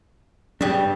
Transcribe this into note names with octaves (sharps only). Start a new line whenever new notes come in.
G2 C#3 G3 D4 G4